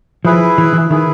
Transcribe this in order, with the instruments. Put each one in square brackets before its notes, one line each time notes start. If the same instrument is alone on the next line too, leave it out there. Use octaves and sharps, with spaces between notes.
[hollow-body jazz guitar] F3 [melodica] E4 G#4 B4
[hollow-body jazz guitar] E3
E3
[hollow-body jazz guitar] D#3 [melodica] E4 G#4 B4